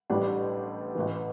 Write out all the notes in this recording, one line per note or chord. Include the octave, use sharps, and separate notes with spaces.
A1 A2 G3 D4
A1 A2 E3